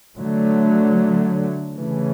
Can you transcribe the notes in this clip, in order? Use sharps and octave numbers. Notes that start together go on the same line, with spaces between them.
D3 F#3 A3
C#3 E3 A3 C#4